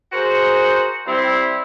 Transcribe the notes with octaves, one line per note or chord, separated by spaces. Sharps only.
F#4 G#4 A#4 C5
G3 C4 E4